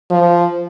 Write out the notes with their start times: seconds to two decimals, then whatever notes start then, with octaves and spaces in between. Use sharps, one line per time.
0.10 F3